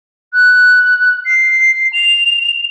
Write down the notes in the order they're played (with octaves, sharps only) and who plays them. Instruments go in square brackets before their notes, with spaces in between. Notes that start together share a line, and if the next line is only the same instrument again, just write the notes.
[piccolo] F#6
C7
F7